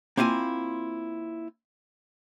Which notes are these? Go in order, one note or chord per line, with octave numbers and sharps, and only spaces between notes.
A#3 C4 E4 F4 G#5